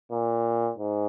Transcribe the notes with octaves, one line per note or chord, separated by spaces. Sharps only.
A#2
G#2